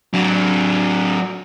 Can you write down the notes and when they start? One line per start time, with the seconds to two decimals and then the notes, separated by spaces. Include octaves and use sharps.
0.13 F#3 D4